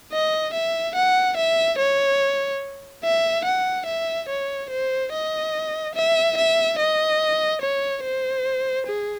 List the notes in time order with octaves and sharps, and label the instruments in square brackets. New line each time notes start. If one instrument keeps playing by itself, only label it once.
[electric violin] D#5
E5
F#5
E5
C#5
E5
F#5
E5
C#5
C5
D#5
E5
E5
D#5
C#5
C5
G#4